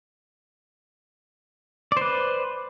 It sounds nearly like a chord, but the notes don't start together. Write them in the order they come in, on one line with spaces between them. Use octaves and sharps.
D5 C5 B4